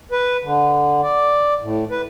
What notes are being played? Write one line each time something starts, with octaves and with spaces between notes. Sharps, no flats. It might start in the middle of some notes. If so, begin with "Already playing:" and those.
B4
D3
D5
A2
B4